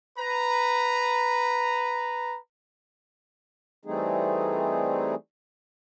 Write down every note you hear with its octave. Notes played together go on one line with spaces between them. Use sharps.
B4 A#5
E3 G3 A3 C4 D#4 G#4